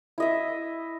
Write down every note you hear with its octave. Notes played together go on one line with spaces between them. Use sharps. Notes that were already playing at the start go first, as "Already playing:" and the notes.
E4 D#5 E5